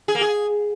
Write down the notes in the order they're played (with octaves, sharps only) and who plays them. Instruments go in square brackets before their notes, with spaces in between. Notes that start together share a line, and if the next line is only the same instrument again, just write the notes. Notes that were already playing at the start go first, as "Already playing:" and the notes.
[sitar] G#4
A#3
G#4